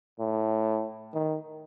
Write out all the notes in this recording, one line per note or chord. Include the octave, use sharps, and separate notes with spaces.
A2
D#3